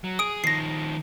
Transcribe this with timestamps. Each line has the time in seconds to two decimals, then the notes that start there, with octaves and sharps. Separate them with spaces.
0.04 F#3
0.19 G#4 D#6 D7
0.44 D#3 F3 A#6 C7